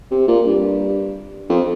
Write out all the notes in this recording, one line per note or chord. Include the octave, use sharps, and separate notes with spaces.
C3
A#2
G2
F2